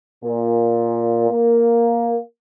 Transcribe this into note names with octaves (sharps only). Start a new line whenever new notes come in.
A#2
A#3